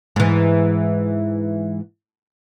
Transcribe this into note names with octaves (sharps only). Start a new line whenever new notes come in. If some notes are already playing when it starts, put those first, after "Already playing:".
G#2 E3